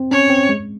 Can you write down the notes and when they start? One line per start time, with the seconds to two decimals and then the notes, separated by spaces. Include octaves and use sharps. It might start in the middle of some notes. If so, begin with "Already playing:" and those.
Already playing: C4
0.11 C#4 C#5
0.30 C4
0.49 G#3